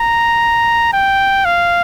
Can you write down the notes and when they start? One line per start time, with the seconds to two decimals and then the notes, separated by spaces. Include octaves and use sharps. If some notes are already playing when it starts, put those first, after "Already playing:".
Already playing: A#5
0.93 G5
1.45 F5